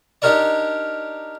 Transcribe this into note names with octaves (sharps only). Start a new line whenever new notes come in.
D4 D#4 G4 A#4 C#5 D5